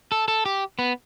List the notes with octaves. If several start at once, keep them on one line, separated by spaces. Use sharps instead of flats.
A4
A4
G4
B3